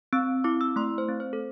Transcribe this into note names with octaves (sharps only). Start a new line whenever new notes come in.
C4 E6
E4 D6
E6
A3 C6
C5
C4
C5
A4